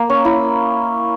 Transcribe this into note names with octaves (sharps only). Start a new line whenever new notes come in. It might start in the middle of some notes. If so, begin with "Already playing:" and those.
Already playing: A#3
C#4
E4